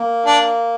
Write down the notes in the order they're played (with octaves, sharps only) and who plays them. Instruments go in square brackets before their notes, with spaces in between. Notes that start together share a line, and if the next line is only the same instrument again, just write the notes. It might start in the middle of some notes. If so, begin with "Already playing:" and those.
Already playing: [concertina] A#3
[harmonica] D4